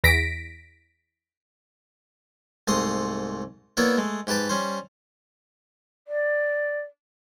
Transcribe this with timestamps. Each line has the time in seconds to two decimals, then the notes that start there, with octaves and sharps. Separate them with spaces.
0.04 E2 A#6 B6 D7
2.68 C2 G#2 A3 D#5 C6
3.77 A#3 B3 E4 C#5 D5 E5
3.98 G#3 A3
4.27 G#2 G4 B4 A5 D6
4.49 G3 C#4 C5
6.08 D5